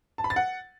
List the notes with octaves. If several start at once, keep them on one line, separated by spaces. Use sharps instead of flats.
A5
B5
A6
F#5